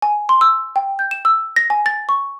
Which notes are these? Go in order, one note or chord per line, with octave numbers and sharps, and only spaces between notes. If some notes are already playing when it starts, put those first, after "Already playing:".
G#5
C6
E6
G5
G6
E7
E6
A#6
G#5
A6
C#6